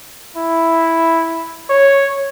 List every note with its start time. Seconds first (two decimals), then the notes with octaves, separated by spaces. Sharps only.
0.37 E4
1.70 C#5